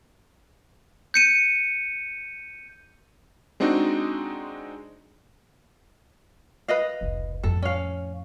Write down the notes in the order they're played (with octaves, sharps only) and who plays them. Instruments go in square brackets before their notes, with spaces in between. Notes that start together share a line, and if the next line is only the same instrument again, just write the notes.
[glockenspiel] G6 C#7 D#7
[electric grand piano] G#3 C4 D4 D#4 F#4
[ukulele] B4 D#5 F5
[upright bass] F1 C#2
[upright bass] F2 A2 [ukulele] A4
[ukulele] C#4 F5